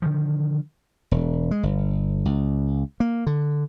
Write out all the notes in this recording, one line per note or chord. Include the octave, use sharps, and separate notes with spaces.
D3 D#3 F3
E1
G#3
G1
C#2
A#3
D3